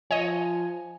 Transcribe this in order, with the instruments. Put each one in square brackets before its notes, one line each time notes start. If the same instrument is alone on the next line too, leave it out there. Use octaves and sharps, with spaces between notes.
[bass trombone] F3 [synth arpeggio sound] C#5 D#5 [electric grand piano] G#5